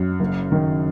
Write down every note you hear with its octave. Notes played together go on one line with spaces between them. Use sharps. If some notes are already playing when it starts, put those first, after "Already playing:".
Already playing: F#2
F#1
D#3